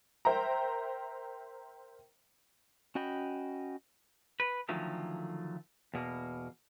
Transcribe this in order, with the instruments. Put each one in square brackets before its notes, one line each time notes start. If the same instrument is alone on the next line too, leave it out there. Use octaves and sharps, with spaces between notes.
[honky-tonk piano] A#4 C5 E5 G5 A#5
[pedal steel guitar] C#4 F#4 D#5 G5 B5
[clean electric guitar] B4
D3 D#3 F3 F#3 A3 C#4
E2 B2 A#3